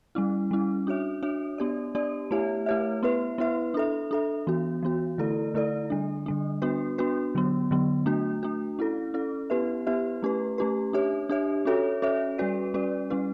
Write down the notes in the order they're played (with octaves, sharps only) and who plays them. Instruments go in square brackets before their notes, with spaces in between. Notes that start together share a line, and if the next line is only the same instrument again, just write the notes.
[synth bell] G3 C#4 E4
G3 C#4 E4
D4 F#4 C#5 E5
D4 F#4 C#5 E5
B3 D4 G4 D5
B3 D4 G4 D5
A3 E4 G4 C#5 E5
A3 E4 G4 C#5 E5
B3 E4 B4 E5
B3 E4 B4 E5
D4 A4 E5
D4 A4 E5
E3 B3 F#4
E3 B3 F#4
D3 A3 E4 A4 D5
D3 A3 E4 A4 D5
D3 G3 D4
D3 G3 D4
B3 D4 F#4 B4
B3 D4 F#4 B4
D3 F#3 B3
D3 F#3 B3
A3 D4 F#4
A3 D4 F#4
C#4 E4 A4
C#4 E4 A4
B3 E4 G4 B4 E5
B3 E4 G4 B4 E5
A3 C#4 G4 B4
A3 C#4 G4 B4
D4 G4 C#5 E5
D4 G4 C#5 E5
C#4 F#4 A4 C#5 E5
C#4 F#4 A4 C#5 E5
G3 C#4 F#4 B4 D5
G3 C#4 F#4 B4 D5
G3 C#4 E4 B4